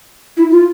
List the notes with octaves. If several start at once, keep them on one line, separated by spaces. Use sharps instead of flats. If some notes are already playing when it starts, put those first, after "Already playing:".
E4
F4